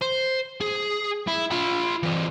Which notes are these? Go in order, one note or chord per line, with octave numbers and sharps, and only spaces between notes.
C5
G#4
E4
F4 B5
E3 C4